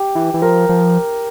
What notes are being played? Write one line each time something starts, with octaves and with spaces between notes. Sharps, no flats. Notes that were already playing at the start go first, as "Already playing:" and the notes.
Already playing: G4
E3
E3
F3 A#4
F3